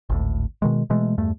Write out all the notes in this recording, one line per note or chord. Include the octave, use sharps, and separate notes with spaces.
G#1 D2 A2
B2 D#3 G#3
B2 E3 G#3 A3
E2 G2 A3